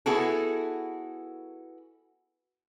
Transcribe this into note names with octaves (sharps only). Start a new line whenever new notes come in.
B3 E4 F#4 G#4 A4